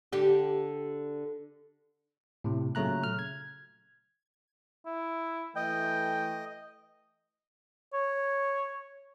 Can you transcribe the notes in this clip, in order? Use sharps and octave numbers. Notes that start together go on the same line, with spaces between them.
D3 G4
A2 C3
A#2 C#3 F#3 A3 A#5 F#6
F6
G#6
E4
E3 A3 D#5 G5
C#5